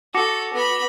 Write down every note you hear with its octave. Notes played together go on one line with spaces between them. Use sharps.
F#4 A4 D6 A#6 C#7
B3 B5